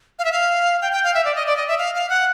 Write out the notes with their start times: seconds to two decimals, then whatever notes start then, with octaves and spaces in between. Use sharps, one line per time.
0.19 F5
0.25 E5
0.32 F5
0.82 G5
0.92 G5
1.04 F5
1.14 E5
1.25 D5
1.36 D#5
1.47 D5
1.57 D#5
1.68 E5
1.78 F5
1.95 F5
2.10 F#5